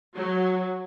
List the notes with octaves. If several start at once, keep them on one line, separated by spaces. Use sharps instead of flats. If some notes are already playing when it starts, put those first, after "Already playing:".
F#3